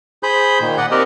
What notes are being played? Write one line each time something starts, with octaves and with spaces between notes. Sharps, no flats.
G#4 C5 B5 G6
A#2 D#3
D5 D#5 F#5
C4 G4 A#4 D5 D#5